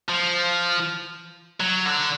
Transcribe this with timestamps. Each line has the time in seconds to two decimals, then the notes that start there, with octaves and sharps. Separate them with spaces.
0.09 F3
1.60 F#3
1.86 D3